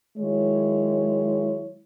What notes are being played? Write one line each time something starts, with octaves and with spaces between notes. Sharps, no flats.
D#3 F#3 G#3 E4 C#5